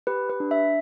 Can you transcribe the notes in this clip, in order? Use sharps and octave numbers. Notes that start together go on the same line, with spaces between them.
G4 B4
B4
D4
E5